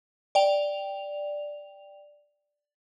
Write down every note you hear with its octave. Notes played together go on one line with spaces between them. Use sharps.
D5 G5 F7